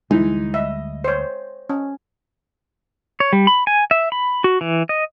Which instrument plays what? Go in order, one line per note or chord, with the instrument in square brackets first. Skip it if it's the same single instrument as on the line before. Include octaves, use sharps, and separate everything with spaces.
[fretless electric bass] D2 G3 [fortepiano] E3 D#4 E4 [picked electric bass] G#3
[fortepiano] D#5 [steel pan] E5
[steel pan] C5 C#5
C#4
[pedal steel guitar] C#5
G3
B5
G#5
E5
B5
F#4
E3
D#5